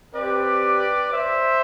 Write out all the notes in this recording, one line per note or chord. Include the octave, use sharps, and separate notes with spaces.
C4 G4 B4 D5
C5 E5